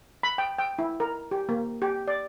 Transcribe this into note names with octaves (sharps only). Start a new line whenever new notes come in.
B5
G5
G5
E4
A#4
G4
A#3
G4
D5